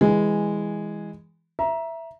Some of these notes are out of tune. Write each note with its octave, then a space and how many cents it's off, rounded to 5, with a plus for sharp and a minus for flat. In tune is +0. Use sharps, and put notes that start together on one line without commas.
E3 +0 G#3 -10
E5 +5 A#5 +20